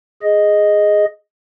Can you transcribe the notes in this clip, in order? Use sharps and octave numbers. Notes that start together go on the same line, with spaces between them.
G#4 D#5